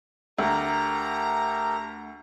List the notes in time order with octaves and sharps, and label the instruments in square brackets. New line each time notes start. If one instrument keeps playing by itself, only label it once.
[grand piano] D2 [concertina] G4 A4 A#4 [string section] A#5